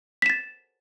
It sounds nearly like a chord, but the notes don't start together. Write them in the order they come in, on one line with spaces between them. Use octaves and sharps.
B6 E7 A6